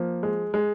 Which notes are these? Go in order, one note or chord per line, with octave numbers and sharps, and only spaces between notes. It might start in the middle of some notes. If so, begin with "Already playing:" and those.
Already playing: F3 A#3
G#3
G#3